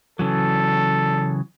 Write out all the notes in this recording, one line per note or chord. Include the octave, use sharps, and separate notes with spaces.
C#3 E3 F#3 A4